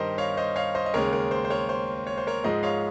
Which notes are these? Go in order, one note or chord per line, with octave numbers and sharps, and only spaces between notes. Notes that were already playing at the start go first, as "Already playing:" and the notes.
Already playing: G2 D#3 G3 A#4 C5 D#5
C#5 F5
C5 D#5
C#5 F5
C5 D#5
D#5
D#2 C#3 G#3 A#4 C#5
A#4
C5
C5
A#4 C#5
C5
C#5
C5
A#4 C#5
G#2 F3 G#3 C5 D#5
C#5 F5